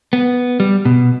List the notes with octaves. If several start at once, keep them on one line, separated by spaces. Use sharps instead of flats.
B3
G3
B2